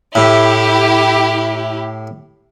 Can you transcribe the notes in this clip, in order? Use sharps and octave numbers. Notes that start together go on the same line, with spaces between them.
A2 E4 G4